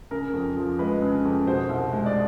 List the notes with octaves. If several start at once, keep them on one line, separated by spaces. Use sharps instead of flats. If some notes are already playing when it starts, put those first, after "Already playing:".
C#3 A#4
F2
F3
G#3 B4
C#3
F2
B2 C5
C2
G#3
D5